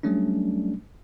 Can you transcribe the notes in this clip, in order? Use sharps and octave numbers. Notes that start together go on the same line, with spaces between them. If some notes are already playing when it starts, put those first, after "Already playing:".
F#3 G3 A3 C#4 D4